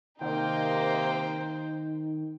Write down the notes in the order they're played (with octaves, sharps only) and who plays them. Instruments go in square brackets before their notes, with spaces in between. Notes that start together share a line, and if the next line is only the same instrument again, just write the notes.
[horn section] C3 A#3 [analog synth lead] D#3 [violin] D#4 C5 [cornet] G5